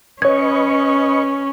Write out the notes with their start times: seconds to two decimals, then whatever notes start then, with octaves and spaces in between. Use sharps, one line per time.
0.22 C#4 B4 C#5 D#5 C#6 G#6